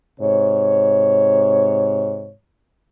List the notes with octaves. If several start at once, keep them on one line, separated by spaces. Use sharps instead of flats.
G#2 C3 C#5